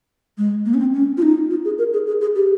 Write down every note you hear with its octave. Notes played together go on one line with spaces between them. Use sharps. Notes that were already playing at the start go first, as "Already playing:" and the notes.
G#3
A#3
C#4
C4
C#4
F4
D#4
F4
G#4
A#4
G#4
G#4
G#4
G4